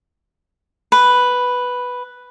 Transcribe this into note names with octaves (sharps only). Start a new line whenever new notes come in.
B4